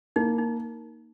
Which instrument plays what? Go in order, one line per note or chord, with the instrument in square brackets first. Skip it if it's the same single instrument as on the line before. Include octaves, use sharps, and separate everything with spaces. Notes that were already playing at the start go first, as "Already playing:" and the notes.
[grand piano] A#3 [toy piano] D#4
[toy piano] D#4